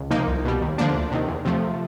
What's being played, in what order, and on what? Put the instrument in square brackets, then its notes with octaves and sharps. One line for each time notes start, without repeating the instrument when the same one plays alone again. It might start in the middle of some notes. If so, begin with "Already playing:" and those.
Already playing: [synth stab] C#2
C3 F3 A#3 D#4
C2
B2 G3
D#2
D3 F3 A#3 D4
D2
C3 D#3
E2
C3 F3 A3